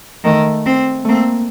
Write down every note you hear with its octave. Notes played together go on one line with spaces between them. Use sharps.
D#3 A3
C4
A3 A#3 C4